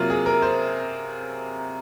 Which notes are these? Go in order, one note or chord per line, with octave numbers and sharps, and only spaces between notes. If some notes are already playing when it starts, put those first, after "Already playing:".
Already playing: C3 F#3 A#3 F4
G#4
A#4
C5